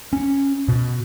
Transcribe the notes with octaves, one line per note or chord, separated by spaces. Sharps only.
C#4
B2